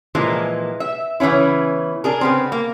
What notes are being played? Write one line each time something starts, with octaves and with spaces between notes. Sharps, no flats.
A#2 E3 F3 G#3 A#3
E5
C#3 E3 B3 C#4 E4
D4 G#4 A#4
C#3 B3 C4
A#3